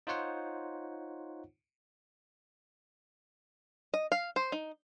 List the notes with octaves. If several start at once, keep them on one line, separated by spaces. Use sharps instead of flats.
D#4 F4 C5 C#5 F#5
D#5
F5
C5
D#4